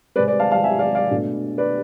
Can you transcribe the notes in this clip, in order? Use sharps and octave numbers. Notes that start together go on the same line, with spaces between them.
C3 G#3 C4 B4 D5
B4 D5
F5 A5
F5 A5
E5 G#5
D5 F5
D5 F5
B2 A3 D4
B4 D5